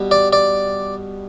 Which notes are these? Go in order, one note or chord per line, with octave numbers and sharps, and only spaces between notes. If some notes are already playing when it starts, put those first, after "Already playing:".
Already playing: B2 G3
D5
D5